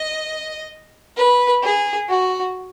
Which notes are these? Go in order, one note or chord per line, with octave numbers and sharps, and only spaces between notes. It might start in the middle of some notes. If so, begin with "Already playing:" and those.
Already playing: D#5
B4
G#4
F#4